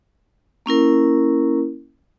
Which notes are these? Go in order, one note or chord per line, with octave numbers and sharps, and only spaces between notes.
A#3 C#4 E4 A#4